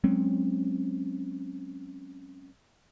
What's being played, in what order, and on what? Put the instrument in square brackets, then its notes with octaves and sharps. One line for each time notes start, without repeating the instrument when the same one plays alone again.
[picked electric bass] F#3 G#3 C4 C#4